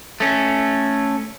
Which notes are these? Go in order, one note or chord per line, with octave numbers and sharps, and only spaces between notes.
A3 C#4